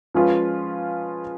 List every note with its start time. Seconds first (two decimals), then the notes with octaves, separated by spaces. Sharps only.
0.14 F3 G#3 C#4 F4 B4